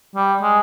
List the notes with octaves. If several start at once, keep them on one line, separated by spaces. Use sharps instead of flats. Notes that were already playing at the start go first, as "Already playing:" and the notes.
G3
G#3